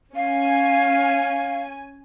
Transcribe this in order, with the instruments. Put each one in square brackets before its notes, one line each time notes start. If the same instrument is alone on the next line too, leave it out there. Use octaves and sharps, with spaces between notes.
[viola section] C#4 G#5 [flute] F5